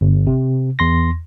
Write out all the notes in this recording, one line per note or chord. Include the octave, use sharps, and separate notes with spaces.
G1
C3
E2 C6 A#6